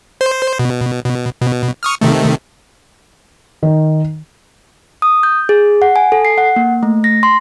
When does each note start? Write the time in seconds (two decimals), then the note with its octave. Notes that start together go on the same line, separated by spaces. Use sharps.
0.21 C5
0.59 B2
1.04 B2
1.41 B2
1.83 C#6 D#6 F6
2.01 C3 D#3 A3
3.63 D#3
5.02 D#6
5.23 G6
5.49 G#4
5.82 F#5
5.96 G#5
6.12 A4
6.25 C7
6.38 F#5
6.56 A#3
6.83 A3
7.04 A#6
7.23 C6